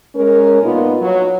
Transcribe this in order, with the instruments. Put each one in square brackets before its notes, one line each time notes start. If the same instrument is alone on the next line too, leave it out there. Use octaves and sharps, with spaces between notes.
[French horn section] G#3 C#4 A#4
A#2 B3 D#4 F4
F#3